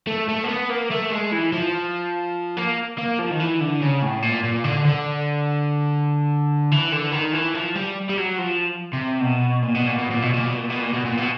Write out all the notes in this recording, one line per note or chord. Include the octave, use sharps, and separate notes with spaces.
A3
A3
A#3
B3
A#3
A3
G#3
E3
F3
A#3
A#3
F3
D#3
E3
D3
C#3
A2
A#2
A#2
D3
D3
E3
D3
D#3
E3
F3
G3
G3
F#3
F3
C3
B2
A#2
B2
A#2
B2
A#2
B2
A#2
B2
A#2
B2
A#2
B2
A#2
B2